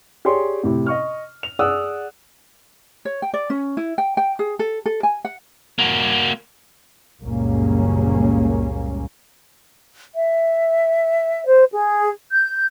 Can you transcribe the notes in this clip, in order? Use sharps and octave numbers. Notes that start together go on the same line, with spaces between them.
G4 G#4 C#5 D5 C6
A2 C3 E4
D#5 C#6 F6
F7
G#4 D5 F#5 D#6 E6 F#6
C#5
G5
D5
C#4
E4
G5
G5
G#4
A4
A4
G#5
F#5
A#3 F#4
F#1 C#2 A#2 G3 A#3 C#4
E5
C5
G#4
G6